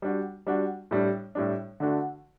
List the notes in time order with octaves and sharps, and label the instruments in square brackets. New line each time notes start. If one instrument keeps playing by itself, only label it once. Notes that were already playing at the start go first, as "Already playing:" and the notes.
[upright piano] G3 D4 F#4
G3 D4 F#4
A2 G3 D4
A2 G3 D4
D3 A3 D4 F#4